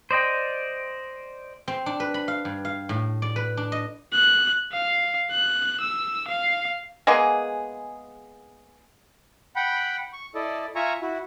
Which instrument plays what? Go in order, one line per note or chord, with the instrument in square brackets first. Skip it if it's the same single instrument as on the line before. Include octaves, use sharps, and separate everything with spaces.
[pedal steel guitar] C5 D5 D#5 G5
[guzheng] C4
D4
B4
B5
F5
G2
F5
A2
D5
B4
D4
D#5
[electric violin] F#6
F5
F#6
E6
F5
[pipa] G#3 A#3 B3 G#4
[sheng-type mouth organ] F#5 G5 B5
C#6
E4 A4 D5 D#5
F4 E5 G#5 A#5 C#6
E4 F#4